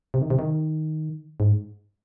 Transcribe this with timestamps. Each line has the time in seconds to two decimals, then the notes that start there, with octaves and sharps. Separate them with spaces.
0.14 C3
0.22 D#3
0.30 C3
0.39 D#3
1.40 G#2